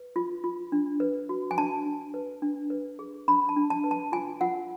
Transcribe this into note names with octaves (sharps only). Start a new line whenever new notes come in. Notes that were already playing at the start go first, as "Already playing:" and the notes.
Already playing: B4
F4
F4
D4
B4
F#4
G#5
D4 A5
D4
B4
D4
B4
G#4
D4 B5
A5
D4
A5
B4
A5
F4 G#5
F4 F#5